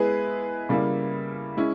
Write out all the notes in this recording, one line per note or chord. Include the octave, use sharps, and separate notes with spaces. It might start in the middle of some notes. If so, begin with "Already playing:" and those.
Already playing: G#3 B3 E4 G#4 B4
C#3 G3 A#3 E4
G#3 C#4 E4